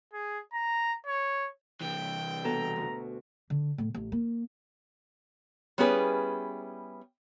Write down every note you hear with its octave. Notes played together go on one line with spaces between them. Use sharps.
G#4
A#5
C#5
C2 E3 G5
B2 A4 A#5
D2
D3
A2
A1
A#3
G3 B3 C#4 E4 G#4 B4